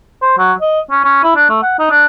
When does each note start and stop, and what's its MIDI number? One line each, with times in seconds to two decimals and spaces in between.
0.22 0.35 72
0.38 0.53 54
0.61 0.80 75
0.91 1.02 61
1.04 1.23 61
1.24 1.31 64
1.36 1.47 62
1.50 1.60 57
1.62 1.79 78
1.79 1.91 63
1.91 2.06 62